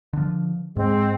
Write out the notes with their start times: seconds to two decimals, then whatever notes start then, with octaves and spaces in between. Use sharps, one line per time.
0.13 D3 F3
0.77 G#2 G#3 C4